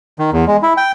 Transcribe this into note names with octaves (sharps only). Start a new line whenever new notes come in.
D#3
E2
G#3
E4
G5